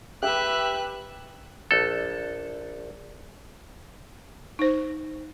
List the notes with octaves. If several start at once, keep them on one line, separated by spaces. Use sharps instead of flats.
G4 B4 E5 F#6
A#1 A4
D#4 C5